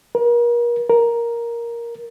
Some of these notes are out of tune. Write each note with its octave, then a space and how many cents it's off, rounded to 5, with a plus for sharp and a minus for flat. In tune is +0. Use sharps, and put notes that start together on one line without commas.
A#4 +35
A#4 +5